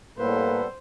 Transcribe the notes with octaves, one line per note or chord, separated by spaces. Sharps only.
A2 G3 A#3 B3 A4 B4 C5